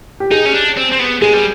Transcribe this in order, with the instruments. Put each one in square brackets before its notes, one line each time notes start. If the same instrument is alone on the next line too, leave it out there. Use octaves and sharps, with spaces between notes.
[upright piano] G4
[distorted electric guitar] D#4 [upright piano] G#4
[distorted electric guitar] C#4
D4
C4
C4
B3
[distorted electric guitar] G#3 [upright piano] G#4
[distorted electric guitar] G3